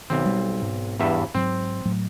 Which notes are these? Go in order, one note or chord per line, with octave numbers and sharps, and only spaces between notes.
B1 D#3 C4
G3
G#2
E2 G2 E5
G#2 F#3 C4
A2 F#3 A3